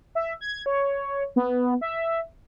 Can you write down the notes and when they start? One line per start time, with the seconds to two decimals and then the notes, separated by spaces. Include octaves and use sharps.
0.15 E5
0.41 G#6
0.66 C#5
1.36 B3
1.81 E5